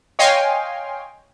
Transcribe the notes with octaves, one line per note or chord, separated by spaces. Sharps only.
C#5 D#5 F5 G5 G#5 C6